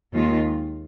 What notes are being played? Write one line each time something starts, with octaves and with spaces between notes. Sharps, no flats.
D#2 D#3 G#3 F4